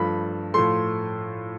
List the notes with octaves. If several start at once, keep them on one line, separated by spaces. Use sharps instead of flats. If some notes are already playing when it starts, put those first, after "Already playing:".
Already playing: G2 F3 A3 B5
A2 F3 A3 C6